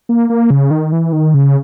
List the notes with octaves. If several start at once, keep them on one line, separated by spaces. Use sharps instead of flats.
A#3
A#3
C#3
D#3
E3
D#3
C#3